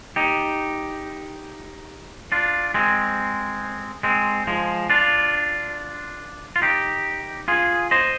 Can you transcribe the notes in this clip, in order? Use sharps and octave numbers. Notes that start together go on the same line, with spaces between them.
D#4 G4
D4 F4
G#3 C4
G#3 C4
F3 G#3
D4 F4
F4
D#4 G4
F4 G#4
C5 D#5